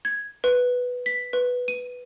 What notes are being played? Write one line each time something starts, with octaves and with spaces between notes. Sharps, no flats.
G#6
B4
B6
B4
D#7